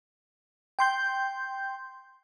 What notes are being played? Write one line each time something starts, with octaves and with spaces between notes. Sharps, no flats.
G5 C6 G6